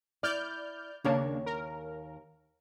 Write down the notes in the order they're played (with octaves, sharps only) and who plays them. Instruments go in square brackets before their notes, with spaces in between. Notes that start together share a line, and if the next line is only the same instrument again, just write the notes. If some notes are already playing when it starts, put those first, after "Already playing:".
[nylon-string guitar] E4 [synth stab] D5 F6 G6
[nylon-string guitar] D#2 C#5 [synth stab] C#3 A#3 D4
[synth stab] A#4